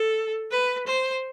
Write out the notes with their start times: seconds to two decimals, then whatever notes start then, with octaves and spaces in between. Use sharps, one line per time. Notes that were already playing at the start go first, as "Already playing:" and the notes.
Already playing: A4
0.51 B4
0.87 C5